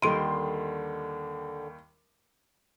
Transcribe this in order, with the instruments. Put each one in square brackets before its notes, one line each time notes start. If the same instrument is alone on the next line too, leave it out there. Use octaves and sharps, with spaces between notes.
[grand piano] D#2 D#3 G3 [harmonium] D3 [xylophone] A4 D7 D#7 [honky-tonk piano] C6